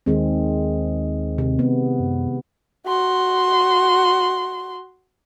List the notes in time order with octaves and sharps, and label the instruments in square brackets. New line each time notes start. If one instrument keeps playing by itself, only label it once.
[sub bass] D#2 [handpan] D#3 G#3 C4
[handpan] C3
B3
[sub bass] F#2
[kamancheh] F#4 C6